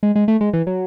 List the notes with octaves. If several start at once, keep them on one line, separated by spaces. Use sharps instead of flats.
G#3
G#3
A3
G#3
E3
F#3